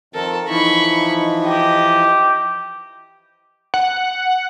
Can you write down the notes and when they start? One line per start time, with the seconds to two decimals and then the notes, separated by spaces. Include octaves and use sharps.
0.14 F2 D#3 C4 A4 A#4
0.49 E3 F3 D#4 E4 B5 C#6
1.44 G4 D#5
3.74 F#5